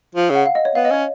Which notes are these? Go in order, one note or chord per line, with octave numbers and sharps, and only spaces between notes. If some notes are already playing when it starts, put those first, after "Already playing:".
F3
C#3
F#5
F5
D#5
C#5
B3 F5
D#5
C#4 C#5